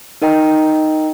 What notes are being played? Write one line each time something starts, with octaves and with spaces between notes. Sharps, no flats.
D#4 A#4 D#5 G5 A#5